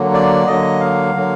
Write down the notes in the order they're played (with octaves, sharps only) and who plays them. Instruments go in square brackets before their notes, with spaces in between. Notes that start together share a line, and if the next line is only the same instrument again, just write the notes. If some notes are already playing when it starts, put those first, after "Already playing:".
Already playing: [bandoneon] D3 F#3 A#3
D5
D3 F#3 A#3 D#5
F5
D3 F#3 A#3